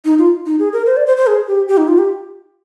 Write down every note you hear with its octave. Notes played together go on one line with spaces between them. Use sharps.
D#4
F4
D#4
G#4
A#4
C5
D5
C5
C5
G#4
G4
G4
D#4
F4
G4